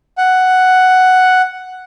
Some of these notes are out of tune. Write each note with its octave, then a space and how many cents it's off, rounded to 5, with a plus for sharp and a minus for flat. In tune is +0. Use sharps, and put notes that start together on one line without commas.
F#5 +5